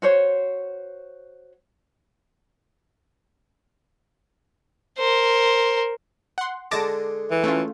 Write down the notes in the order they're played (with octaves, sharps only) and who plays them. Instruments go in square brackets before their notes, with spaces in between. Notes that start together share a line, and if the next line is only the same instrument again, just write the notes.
[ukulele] F#4 C5 C#5
[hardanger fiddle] A#4 C5
[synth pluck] F#5 C6
[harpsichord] D3 G#3 D#5 [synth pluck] A5 D6 A#6
[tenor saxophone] E3
[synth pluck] A3 C#4 F4